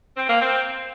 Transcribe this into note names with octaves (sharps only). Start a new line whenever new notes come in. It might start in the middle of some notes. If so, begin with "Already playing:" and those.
C4
A#3
C4